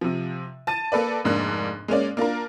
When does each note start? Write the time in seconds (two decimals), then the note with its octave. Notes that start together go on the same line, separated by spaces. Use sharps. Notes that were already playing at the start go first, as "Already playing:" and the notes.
0.01 C3 F3
0.67 A5 A6 D#7
0.92 A#3 A4 B4 D5
1.25 F1 G#2 A#3 D4 F#6
1.88 G#3 A#3 C#4 D5
2.17 A#3 D4 F4 A#4